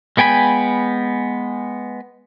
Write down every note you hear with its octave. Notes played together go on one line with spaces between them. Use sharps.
G#3 B3 G5 G#5 B5